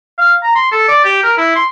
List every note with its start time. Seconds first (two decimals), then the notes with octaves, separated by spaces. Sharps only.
0.18 F5
0.43 A#5
0.55 C6
0.72 A4
0.88 D5
1.05 G4
1.23 A#4
1.37 E4
1.56 C6